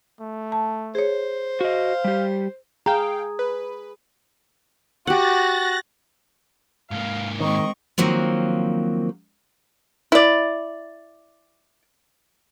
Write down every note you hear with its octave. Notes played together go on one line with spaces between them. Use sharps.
A3
A5
G#4 C5 C#5
F#4 D#5 F5
G3 G4
G#4 F5 G5 A#5
B4
F#4 G4 F#5 F#6 A6 A#6
G#2 A#3 F5
D#3 G#3 C4 D#5 C#6
D#3 F3 F#3 A#3 C4
E4 D5